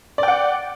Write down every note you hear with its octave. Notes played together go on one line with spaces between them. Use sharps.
D5 F#5 G5